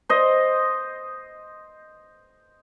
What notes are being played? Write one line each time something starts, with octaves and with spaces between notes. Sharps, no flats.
C5 D#5